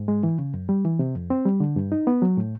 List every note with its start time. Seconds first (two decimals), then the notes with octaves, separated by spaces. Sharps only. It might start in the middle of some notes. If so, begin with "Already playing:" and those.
Already playing: G#2
0.08 G#3
0.23 E3
0.39 C#3
0.54 F#2
0.69 G3
0.85 E3
0.99 C3
1.16 F2
1.30 C4
1.46 G3
1.60 D3
1.76 G2
1.92 D#4
2.07 B3
2.22 F#3
2.37 A2